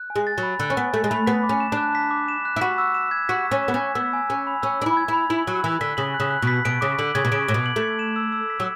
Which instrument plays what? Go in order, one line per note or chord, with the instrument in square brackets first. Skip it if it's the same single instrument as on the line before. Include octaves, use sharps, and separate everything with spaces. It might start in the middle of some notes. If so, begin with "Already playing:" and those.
Already playing: [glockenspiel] F#6
G#5
[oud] G#3
[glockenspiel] A6
[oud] F#3
[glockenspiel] B5
[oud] D3 [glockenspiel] F#6
[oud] C#4
[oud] B3 [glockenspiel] G#5
[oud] A3 [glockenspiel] A6
[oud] G#3
[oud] A3 [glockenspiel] B5
[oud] B3 [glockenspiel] B6
[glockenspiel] D6
[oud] C#4
[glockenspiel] E7
[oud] D4
[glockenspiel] F#6
B6
D6
E7
F#6
[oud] E4
[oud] F#4 [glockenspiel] B6
[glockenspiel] E6
E7
G#6
[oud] F#4 [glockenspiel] B6
[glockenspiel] E6
[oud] C#4
[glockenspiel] E7
[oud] B3
C#4
[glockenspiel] G#6
[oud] B3 [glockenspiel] E6
[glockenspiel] G#5
[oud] C#4 [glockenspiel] G#6
[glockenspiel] B5
[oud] C#4 [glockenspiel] E6
[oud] D4 [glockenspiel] G#5
[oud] E4
[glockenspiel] G#6
[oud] E4 [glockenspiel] B5
[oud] E4 [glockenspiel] F#7
[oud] F#3 [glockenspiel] F#6
[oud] E3 [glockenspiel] F#6
[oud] D3 [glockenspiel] B6
[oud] C#3 [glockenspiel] F#7
[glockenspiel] F#6
[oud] C#3
[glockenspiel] F#6
[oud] B2 [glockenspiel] B6
[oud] B2 [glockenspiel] D7
[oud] C#3 [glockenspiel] D6
[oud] D3 [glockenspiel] F#7
[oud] C#3 [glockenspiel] G#6
[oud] B2
[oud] C#3 [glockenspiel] D7
[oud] A2 [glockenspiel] D6
[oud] B2
[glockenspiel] F#7
[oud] A3
[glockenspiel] G#6
E7
E6
E6
B6
[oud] F#3